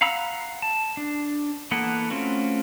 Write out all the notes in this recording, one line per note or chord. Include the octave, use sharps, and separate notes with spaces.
F5 F#5 A#5 B5 E6
A5
D4
E3 A#3 B3 A4 F#5
A3 C4 C#4 F4 F#4